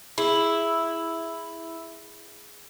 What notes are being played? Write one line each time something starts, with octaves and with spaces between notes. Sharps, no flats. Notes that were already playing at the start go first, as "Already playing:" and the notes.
E4 G#4